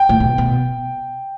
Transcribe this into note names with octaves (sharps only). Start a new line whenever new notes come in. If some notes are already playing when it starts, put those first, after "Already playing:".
Already playing: G5
A2
B2
B2